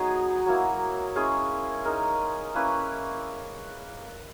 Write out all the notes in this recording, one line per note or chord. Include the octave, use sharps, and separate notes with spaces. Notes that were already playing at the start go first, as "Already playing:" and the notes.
Already playing: F#3 B3 D#4 G#4
F#3 A#3 E4
G#3 C#4 E4 G#4
G#3 D#4 A#4
A#3 C#4 E4 B4